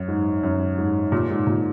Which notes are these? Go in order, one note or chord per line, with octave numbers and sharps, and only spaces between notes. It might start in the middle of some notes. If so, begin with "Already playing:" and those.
Already playing: F#2
G#2
F#2
G#2
A#2
G#2
A#2